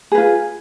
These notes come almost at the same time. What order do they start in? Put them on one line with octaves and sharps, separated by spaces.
G#4 B4 F4